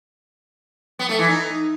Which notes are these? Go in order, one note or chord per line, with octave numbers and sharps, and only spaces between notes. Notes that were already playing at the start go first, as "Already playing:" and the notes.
B3
A3
E3
D#4